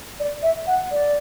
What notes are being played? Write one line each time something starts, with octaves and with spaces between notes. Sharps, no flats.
D5
E5
F#5
D5